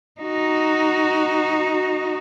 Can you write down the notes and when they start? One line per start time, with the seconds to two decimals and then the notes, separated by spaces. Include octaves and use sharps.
0.21 D#4 F#4